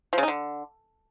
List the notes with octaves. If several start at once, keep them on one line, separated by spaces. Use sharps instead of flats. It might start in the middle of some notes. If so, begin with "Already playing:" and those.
F3
C#3
D#4
D3